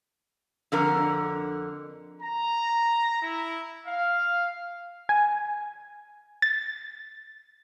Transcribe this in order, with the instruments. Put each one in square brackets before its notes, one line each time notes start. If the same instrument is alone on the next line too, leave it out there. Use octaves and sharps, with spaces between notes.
[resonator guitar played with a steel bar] F2 D3 A#4
[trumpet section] A#5
E4
F5
[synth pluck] G#5
A6